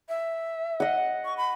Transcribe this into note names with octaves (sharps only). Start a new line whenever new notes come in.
E5
D#5 F#5
C#6
B5